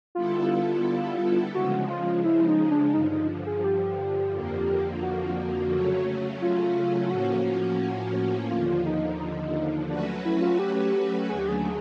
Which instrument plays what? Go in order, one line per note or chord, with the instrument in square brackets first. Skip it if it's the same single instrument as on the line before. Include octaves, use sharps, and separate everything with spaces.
[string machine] D3 G3 B3 E4 A4 [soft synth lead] F4
[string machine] C#3 F3 G#3 [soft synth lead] F#4
[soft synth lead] F4
E4
D#4
D4
[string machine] G2 D3 F3 [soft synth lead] D#4
[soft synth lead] D#4
G#4
G4
[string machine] F2 D3 F3 A#3
[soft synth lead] F#4
[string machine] C#3 F#3 A3 C#4
[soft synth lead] F4
F4
[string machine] A2 F3 A#3 C#4 [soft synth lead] F#4
[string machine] D#2 D3 F3 [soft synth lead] F4
[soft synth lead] D#4
D#4
[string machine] F#3 A3 C#4 F#4 B4 [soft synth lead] D4
[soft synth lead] E4
F4
G4
[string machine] D#2 D3 F#3 A3 [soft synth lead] G#4
[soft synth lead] G4
G#4